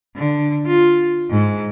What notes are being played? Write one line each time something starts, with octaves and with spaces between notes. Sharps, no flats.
D3
F4
G#2